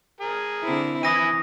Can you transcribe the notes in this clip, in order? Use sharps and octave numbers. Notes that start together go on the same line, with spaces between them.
G#4 A#4
D3 C4 E4
E3 E4 E5 G#5 D#6 A#6 D#7